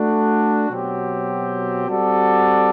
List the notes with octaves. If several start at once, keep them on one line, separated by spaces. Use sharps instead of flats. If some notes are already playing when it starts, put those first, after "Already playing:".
Already playing: A3 D4 F#4
B2 F#3 C4 G4
G3 C4 F#4 A4 D5